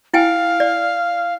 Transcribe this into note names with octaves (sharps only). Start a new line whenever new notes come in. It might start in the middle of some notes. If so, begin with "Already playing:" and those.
E4 F5 G5 G#5
D5